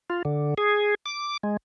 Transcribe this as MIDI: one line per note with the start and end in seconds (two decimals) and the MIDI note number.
0.10 0.22 65
0.25 0.54 50
0.58 0.95 68
1.06 1.37 86
1.43 1.57 56